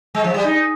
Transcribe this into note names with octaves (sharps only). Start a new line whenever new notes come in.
G#3
F3
G3
D#4